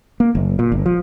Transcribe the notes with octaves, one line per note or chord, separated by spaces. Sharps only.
A#3
F#1
A#2
G1
F3